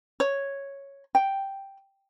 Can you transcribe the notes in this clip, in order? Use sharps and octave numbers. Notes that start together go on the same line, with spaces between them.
C#5
G5